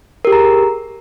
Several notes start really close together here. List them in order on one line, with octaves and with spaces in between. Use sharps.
A#4 G4 G#4 A#5